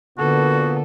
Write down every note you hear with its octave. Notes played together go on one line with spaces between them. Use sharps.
A#2 D3 B3 F#4 A4